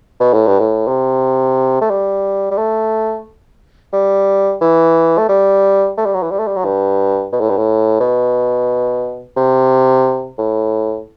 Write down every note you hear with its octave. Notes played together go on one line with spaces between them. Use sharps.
B2
A2
G2
A2
C3
A3
G3
G3
A3
G3
E3
A3
G3
A3
G3
F#3
E3
G3
A3
G3
F#3
G2
B2
A2
G2
A2
B2
C3
A2